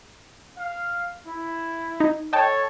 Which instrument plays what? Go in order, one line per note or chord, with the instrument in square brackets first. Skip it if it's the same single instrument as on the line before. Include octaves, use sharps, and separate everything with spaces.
[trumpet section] F5
E4
[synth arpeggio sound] D#4
[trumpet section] A4 C#5 [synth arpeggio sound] D#5 G5 A5